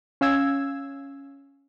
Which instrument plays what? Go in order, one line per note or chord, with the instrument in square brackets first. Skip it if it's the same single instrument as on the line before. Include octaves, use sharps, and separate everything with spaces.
[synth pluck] C#4 F5 E6 G#6